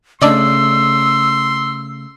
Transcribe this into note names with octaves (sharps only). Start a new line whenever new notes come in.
C#3 A3 D4 D5 D#5 C6 E6